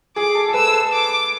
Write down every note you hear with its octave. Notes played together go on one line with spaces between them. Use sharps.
G#4 D6
A4
A4
B4 E6
B4
A4
D6